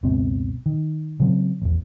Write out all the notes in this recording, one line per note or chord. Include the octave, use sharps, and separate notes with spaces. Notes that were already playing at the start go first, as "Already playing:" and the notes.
F#1 C#2 B2 C4
D#3
C#3 F#3 C4
A1 E2